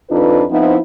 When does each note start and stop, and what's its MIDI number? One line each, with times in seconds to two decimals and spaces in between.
0.10 0.43 41
0.10 0.43 62
0.10 0.43 63
0.10 0.43 65
0.10 0.43 71
0.50 0.78 53
0.50 0.78 59
0.50 0.78 60
0.50 0.78 63
0.50 0.78 64